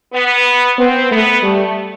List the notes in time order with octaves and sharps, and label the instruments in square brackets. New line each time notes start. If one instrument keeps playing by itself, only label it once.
[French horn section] B3
[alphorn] B3 [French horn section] C4
[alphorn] A3 [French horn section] B3
[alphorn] G3 [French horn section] A3